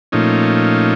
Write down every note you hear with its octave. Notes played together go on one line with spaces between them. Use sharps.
A#2 F3 A3 C#4 D#4